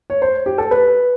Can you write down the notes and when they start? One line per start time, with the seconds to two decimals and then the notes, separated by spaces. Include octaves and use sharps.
0.10 C#5
0.22 C5
0.46 G4
0.58 A4
0.71 B4